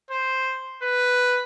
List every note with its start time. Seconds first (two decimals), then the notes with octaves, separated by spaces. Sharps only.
0.11 C5
0.83 B4